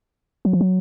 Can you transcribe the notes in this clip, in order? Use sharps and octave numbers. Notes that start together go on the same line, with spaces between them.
F#3
F3
F#3